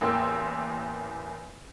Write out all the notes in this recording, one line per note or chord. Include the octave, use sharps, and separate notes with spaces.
A1 E2 A#3 G5 C6 E6